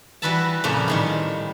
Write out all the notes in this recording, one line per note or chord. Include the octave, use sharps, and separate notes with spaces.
E3 G3 F#4 B4 E5 A5
F2 A#2 C#3 A3 A#3
A2 D#3 G3